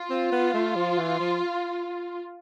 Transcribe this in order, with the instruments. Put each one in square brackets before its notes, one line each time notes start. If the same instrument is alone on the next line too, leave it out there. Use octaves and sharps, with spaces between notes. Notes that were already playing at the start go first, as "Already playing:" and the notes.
Already playing: [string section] F4
[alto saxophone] C4
B3
A3
F3
E3
F3